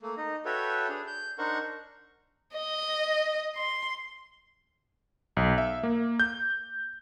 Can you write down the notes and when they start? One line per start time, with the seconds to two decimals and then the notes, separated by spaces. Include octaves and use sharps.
0.01 A3 A#3
0.17 D#4 D#5
0.45 F#4 A4 B4 C#5 E5 G5
0.89 D4 G#4
1.07 G6
1.38 D4 D#4 A#4 C5 F#5 C#6
2.54 D#5
3.55 C6
5.37 B1
5.58 E5
5.83 A#3
6.20 G6